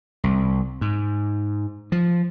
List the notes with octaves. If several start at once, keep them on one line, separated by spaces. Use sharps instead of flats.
C2
G#2
F3